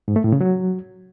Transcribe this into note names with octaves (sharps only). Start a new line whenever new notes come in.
G#2
A3
A2
C#3
F#3